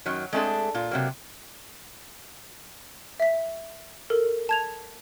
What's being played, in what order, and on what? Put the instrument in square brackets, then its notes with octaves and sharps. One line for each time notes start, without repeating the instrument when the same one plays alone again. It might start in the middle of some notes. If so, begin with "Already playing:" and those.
[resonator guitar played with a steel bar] F#2 D#3 F#3
G#3 A3 C4 D4 G#4 A4
A#2 F4
C3 F#3 A#3
[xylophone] E5 B6
A4 A#4
A5 G#6 F7